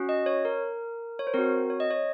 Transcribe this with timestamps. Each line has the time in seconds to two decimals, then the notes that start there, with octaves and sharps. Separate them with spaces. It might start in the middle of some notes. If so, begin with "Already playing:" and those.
Already playing: C#4 F#4
0.09 D#5
0.26 C#5
0.45 A#4
1.19 C#5
1.27 C5
1.34 C4 F#4 A#4
1.70 C#5
1.80 D#5
1.90 C#5